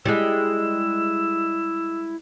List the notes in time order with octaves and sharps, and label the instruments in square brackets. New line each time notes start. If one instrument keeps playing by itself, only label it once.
[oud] G3 G#3 [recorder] E4 [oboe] E6